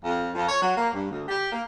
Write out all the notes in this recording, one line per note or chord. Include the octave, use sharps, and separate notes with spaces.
F2
F2
C#5
F#3
A#3
G2
D2
G4
A#3